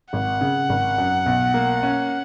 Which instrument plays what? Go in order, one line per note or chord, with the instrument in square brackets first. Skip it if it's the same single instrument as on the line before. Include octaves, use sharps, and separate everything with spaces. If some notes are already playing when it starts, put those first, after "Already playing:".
[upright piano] G#1 [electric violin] F#5
[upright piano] C#3
G#1
F#2
B1
A#3
C#4